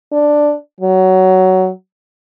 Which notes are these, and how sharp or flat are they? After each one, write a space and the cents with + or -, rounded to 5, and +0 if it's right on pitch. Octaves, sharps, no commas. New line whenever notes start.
D4 +5
F#3 +15